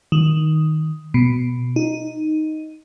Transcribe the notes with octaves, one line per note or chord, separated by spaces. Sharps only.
D#3
B2
D#4